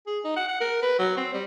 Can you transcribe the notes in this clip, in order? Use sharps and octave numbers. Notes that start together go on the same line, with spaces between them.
G#4
D#4
F#5
F#5
A#4
B4
F#3
C4
G3